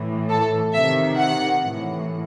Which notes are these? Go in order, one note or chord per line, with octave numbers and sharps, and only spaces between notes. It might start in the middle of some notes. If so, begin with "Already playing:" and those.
Already playing: A2 E3
A4
C3 D#3 E5
F#5
A2 E3